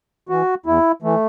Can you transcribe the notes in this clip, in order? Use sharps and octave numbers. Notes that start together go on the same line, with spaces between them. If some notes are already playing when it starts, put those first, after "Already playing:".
E3 F#4
E2 E4
E3 A3